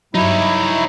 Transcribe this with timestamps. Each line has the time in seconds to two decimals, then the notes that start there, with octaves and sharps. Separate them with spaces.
0.15 G2 F#3 D#4 E4 C#5